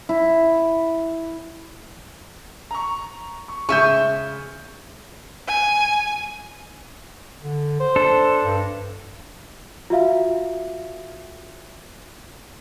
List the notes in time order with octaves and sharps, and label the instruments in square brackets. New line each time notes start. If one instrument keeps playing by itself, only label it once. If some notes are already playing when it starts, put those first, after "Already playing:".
[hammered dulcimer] E4
[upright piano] A#5 C#6
C#6
[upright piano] C#3 G#3 [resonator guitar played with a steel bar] G#4 E5 [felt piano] C#6 G6
[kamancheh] G#5
[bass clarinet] D3
C5
[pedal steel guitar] D4 A4
[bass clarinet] G2
[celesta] F4 F#4 E5 F5